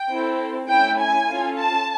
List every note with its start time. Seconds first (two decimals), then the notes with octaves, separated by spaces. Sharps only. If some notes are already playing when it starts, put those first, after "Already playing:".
Already playing: G5
0.09 C4 E4 A4
0.68 A3 C#4 E4 G5
0.98 G#5
1.27 C#4 F4 A4
1.58 A5